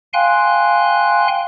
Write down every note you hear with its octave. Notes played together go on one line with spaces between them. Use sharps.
F5 G5 G#5 C6 F#6